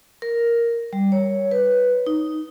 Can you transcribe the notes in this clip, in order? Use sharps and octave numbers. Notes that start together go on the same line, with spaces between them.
A#4
G3
C#5
B4
D#4